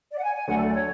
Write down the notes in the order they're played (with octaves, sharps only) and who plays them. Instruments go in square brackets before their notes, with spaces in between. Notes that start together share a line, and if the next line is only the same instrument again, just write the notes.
[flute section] D5
F#5
G#5
G#5
[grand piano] D2 D3 F#3 A3 D4 [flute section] F#5
[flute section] A4
D5
C#5